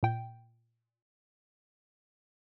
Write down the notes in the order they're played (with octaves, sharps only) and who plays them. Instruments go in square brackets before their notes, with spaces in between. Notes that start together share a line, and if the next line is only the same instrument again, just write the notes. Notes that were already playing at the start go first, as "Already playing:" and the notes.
[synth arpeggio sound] A#2 G5